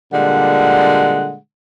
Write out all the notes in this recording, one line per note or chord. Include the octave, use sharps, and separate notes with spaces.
A#2 D3 G3 G#3 F#5